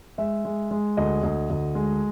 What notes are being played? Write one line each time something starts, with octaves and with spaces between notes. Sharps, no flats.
G#3 E5
G#3
G#3
D2 D#5
D2
D2
G#3